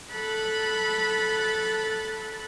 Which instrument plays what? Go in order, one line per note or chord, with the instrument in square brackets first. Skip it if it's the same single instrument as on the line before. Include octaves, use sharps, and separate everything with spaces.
[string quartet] A4 B5 F#6 A6